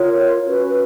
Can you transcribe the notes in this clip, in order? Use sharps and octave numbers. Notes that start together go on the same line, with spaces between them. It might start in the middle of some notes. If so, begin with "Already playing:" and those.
Already playing: F4 A#4 C#5
C#4 F#4 B4